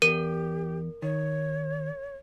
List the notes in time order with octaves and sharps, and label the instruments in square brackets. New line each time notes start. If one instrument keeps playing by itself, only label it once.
[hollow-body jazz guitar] E2 [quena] G4 [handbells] A#4 [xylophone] D#7
[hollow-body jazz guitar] D#3 [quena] C#5